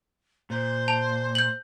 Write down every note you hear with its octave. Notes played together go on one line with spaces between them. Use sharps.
A#2 C5
A5 F7
G6 F#7